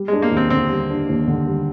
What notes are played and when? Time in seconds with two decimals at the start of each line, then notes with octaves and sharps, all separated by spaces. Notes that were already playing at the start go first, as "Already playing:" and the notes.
Already playing: G3
0.08 G#3 D4
0.22 A#3
0.32 D#2
0.37 C4
0.50 D3 C4
0.71 G3
0.90 D4
1.09 D#2
1.27 D3
1.47 G3